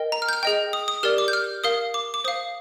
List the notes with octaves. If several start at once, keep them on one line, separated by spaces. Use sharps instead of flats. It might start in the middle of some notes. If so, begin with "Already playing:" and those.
Already playing: A#4 D#5 G5
A#5
F6
G6
F6
G#4 D#5 G5
D#6
D#6
G4 A#4 D5 F6
D6
G6
F6
A#4 F5 D#6
D6
D6
C5 F5 D#6